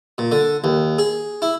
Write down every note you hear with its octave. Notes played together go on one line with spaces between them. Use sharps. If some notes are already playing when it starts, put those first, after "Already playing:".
A#2
D3
D#2
G#4
E4